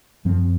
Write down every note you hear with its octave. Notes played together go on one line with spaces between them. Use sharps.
F#2 F3 C4